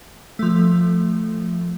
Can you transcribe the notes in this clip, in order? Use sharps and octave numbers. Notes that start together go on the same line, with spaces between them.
F3 A3